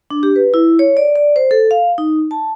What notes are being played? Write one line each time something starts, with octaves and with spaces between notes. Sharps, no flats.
D4
G4
B4
E4
C#5
D5
D5
C5
A4
F5
D#4
A5